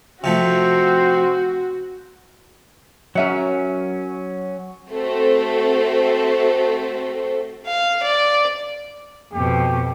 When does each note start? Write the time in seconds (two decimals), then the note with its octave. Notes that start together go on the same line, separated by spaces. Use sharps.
0.24 C3 F3 A3 C4 F#4
3.15 F#3 C#4 A#4 E5 F#5
4.91 A3 C4 F#4 A4 C5
7.66 F5
8.03 D5
9.33 F2 B2 G4